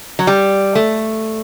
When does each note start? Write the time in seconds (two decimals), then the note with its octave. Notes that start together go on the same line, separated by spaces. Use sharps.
0.19 F#3
0.27 G3
0.75 A3